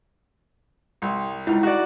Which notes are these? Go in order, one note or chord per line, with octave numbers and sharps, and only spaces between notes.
C2
C#2 D#4 E4
F#4 D5